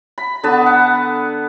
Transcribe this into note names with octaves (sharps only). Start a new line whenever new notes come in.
B5
D3 B3 B4 A5
F#5